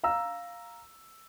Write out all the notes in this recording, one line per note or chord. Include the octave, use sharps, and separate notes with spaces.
F5 A#5 E6